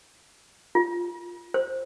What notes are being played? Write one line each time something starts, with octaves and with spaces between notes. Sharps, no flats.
F4
C5